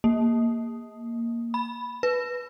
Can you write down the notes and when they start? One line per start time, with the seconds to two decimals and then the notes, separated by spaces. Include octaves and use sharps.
0.04 A#3
1.54 B5
2.03 B4